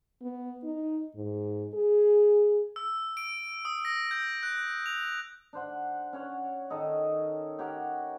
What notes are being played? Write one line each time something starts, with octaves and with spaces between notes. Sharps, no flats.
B3
D#4
G#2
G#4
E6
D7
D#6
A#6
G6
F#6
F7
D4 C5 F#5
C#4 C#5 F#5
D#3 A4 D#5
G4 A#4 C#5 F#5